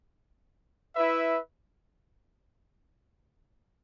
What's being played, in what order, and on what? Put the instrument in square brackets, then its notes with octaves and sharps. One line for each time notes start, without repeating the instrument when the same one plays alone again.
[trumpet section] E4 B4 E5